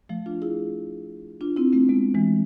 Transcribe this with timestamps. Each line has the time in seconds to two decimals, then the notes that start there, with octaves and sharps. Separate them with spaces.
0.09 F3 A3
0.26 D4 F4
0.42 E4 G#4
1.41 D4 F4
1.56 C4 E4
1.73 A3 C4
1.89 G#3 B3
2.14 E3 G#3